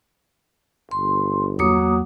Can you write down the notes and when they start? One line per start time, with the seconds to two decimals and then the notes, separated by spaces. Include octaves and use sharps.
0.91 G1 C6
1.59 E2 F#3 A#3 D6 D#6